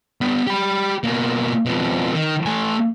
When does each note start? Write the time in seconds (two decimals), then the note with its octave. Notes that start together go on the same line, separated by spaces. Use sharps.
0.21 G3 B3
0.47 G4 B5
1.04 B2 A#3
1.66 F2 B2
2.12 D#3
2.46 A3 G#5